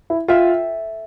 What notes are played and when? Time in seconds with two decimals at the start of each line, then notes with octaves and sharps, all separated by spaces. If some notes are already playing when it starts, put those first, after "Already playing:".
0.10 E4
0.28 F4 A4 E5 G5